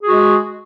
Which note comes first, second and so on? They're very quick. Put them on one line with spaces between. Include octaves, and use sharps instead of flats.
G#4 F#4 G#3